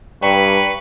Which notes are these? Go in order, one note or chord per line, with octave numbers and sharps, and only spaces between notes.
G2 B4 D5 G5 A#5 C#6